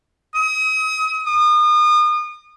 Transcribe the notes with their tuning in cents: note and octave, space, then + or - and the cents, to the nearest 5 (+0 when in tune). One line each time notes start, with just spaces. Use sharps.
D#6 +35
D#6 -35